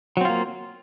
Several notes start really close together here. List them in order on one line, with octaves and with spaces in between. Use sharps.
F#3 C4 F4 A#3